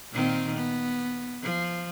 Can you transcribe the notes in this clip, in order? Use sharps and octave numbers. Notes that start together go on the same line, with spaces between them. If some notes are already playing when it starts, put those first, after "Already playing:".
A#2 D#3 C4
B3
F3